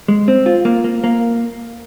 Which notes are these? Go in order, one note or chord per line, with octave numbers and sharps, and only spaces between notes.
G#3
C4
F4
A#3
A#3
A#3